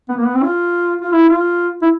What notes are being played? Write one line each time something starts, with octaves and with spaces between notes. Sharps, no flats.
B3
A#3
B3
C4
F4
F4
E4
F4
E4